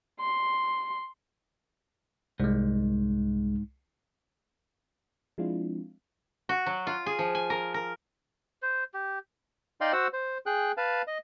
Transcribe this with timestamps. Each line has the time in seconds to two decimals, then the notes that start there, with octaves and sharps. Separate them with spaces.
0.20 C6
2.40 C2 G#2 G#3
5.38 F3 G#3 C4 D4 E4 F4
6.49 F#4
6.66 F#3
6.87 F4
7.06 G#4
7.19 F3
7.35 G#5
7.50 A#4
7.74 A#4
8.62 C5
8.94 G4
9.81 D#4 D5 D#5 F5 G5 C6
9.93 F#4 C5 F#5 E6
10.13 C5
10.46 G#4 G5 F#6
10.77 B4 F5 A5
11.07 D#5